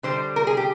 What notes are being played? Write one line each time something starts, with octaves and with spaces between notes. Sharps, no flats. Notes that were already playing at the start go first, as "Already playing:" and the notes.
D3 G3 C5
A#4
G#4
G4